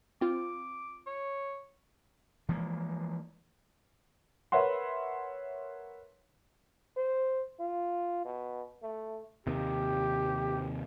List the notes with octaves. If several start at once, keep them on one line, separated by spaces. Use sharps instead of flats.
C4 F4 D6
C#5
E3 F3 G#3 A#3
A#4 B4 C#5 E5 F#5 C6
C5
F4
B2
A3
D#2 C3 G4